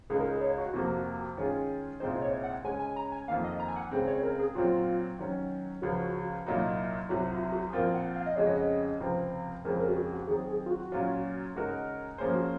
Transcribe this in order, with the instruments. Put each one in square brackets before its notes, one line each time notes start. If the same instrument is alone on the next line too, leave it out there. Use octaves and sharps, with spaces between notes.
[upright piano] C#2 C#3 G#3 D#4 [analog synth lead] G#4
[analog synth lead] A#4
G#4
C#5
F#4
[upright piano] F2 C3 F3 A#3
D#3 G#3 C#4 F4 G#4
[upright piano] C2 A#2 G#3 C4 D#4 [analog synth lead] C5
[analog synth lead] C#5
F#5
[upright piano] C#3 G#3 C#4 [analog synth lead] G#5
[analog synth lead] G#5
A#5
G#5
[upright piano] F2 D#3 A#3 [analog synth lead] F5
[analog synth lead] D#5
A#5
G#5
F#5
[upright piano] C#2 C#3 G#3 C4
[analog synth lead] C#5
A#4
G#4
[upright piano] A#2 F#3 C4 [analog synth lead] F4
[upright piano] D#3 F#3 C#4
[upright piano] C#2 C#3 F3 [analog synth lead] F#4
[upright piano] C2 A#2 F#3 A#3 D#4
[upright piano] C2 C3 F#3 [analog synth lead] F#4
[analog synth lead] F4
F#4
G#4
[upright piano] A#2 F3 C4 F4 C5 [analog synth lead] A#4
[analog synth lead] F#5
F5
D#5
[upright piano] F2 C#3 G#3 C#4 F#4 [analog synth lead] C#5
[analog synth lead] D#5
[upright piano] C#2 C3 F3 C4
[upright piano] F2 C#3 G#3 C4 [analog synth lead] A#4
[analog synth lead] A#4
F#4
G#4
F#4
[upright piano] D#3 [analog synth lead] G#4
[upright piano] F#3 C4
[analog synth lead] G#4
F4
F#4
[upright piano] A#2 F#3 C#4 F4
C#3 G#3 D#4 F#4 A#4
F3 A#3 C#4 G#4 C5
[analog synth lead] F#4